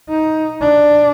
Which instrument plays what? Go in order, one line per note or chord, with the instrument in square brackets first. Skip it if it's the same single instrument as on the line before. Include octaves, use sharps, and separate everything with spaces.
[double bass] D#4
D4